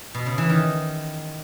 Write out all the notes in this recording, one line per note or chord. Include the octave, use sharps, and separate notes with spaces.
B2
C#3
E3
D#3